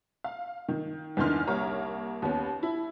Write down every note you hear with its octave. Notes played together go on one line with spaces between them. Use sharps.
F5
D#3
E2 D3 D#3 E4 C6 F6
C2 A#3 C#5 A#5
D#2 B3 C#4
E4